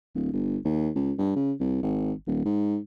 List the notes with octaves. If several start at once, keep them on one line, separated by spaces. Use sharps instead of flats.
D1
G1
D#2
C#2
G2
C#3
C2
G#1
D#1
G#2